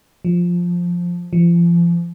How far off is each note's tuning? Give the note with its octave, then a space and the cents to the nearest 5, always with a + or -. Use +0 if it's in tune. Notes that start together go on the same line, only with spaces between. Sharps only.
F3 +5
F3 -35